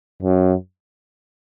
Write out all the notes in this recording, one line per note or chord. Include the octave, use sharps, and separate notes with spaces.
F#2